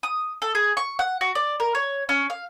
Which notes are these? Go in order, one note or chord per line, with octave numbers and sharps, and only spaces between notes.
D#6
A4
G#4
C#6
F#5
F#4
D5
A#4
C#5
C#4
F5